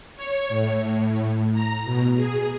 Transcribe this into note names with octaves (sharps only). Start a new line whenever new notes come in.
C#5
A2
A2
A#5
B2
G#4